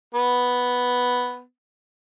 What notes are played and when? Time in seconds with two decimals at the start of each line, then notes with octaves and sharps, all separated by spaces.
0.15 B3